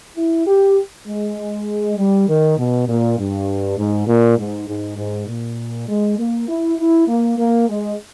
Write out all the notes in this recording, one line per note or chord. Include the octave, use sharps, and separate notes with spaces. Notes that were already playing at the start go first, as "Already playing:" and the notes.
E4
G4
G#3
G3
D#3
B2
A#2
G2
G#2
A#2
G#2
G#2
G#2
A#2
G#3
A#3
E4
E4
A#3
A#3
G#3